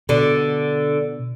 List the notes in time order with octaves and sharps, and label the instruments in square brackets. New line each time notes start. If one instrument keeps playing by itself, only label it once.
[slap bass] B2 [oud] D3